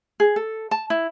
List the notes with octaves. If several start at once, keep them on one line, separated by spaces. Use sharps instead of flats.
G#4
A4
A5
E4